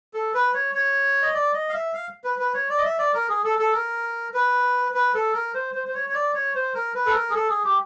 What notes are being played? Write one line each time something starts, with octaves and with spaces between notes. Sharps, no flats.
A4
B4
C#5
C#5
D#5
D5
D#5
F5
E5
F5
B4
B4
C#5
D5
D#5
E5
D5
A#4
G#4
A4
A4
A#4
B4
B4
A4
A#4
C5
C5
C5
C#5
C#5
D5
C#5
C5
A#4
B4
A4
A#4
G#4
A4
G#4
G4